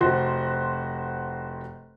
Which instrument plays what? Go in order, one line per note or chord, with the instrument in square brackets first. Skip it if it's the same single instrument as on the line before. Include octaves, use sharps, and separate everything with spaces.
[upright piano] F1 F#4 C5 C6